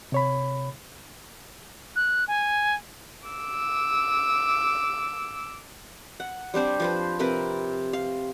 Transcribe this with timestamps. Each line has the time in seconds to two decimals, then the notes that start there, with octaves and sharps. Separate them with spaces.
0.12 C3 C#5 B5
1.95 F#6
2.27 G#5
3.28 D6 E6
6.20 F#5
6.54 G3 C4 D4 C5
6.80 F3 B4 C5
7.19 C3 C4 A#4 B4
7.93 F5